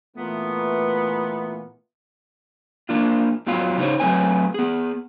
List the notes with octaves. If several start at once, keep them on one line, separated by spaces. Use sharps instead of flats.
A#2 E3 A3 B3
A#3 D4 F4
F2 F#3 B3 F4 F5
C#3 D#4 F#4 G#4 C5 C#5
F#3 A3 C4 B4 G#5
B3 G#4